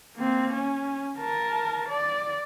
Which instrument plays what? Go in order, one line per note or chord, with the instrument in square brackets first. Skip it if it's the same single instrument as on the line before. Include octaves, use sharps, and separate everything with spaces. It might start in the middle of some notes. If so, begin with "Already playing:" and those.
[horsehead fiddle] A#3 C4
C#4
A#4 A5
D5